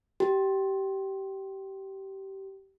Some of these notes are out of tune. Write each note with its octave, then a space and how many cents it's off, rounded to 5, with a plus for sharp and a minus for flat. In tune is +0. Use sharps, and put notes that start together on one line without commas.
G4 -20